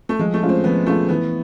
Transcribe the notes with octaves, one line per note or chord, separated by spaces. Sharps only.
A3
F3 G#3
A3
G#3 C#4 F4
C4
F3 B3
G#3 A3 C#4 F4
E3 B3